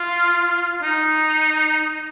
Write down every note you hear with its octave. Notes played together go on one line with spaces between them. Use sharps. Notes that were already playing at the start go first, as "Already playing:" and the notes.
Already playing: F4
D#4